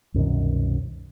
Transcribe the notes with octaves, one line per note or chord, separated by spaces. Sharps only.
C2 F#2 B2 D#3